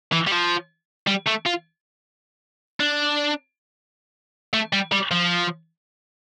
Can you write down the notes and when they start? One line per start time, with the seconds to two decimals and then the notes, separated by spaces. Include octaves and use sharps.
0.12 E3
0.27 G3
0.31 F3
1.07 G3
1.27 A3
1.46 F4
2.80 D4
4.53 A3
4.73 G3
4.92 G3
5.11 F3